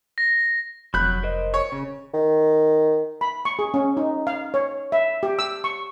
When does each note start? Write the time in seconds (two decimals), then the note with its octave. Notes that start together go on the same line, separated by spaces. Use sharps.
0.18 A#6
0.94 F1 F#3 B5 F#6 G6
1.23 A#4 C5 D#5
1.54 C#5
1.72 C#3
2.14 D#3
3.21 B5
3.45 C#6
3.59 G#4
3.74 C#4
3.97 D#4
4.27 F5
4.54 C#5
4.92 E5
5.23 G4
5.39 E6
5.64 C#6